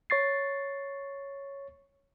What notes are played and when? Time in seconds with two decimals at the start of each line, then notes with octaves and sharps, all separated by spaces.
0.10 C#5 C#6 A6 C7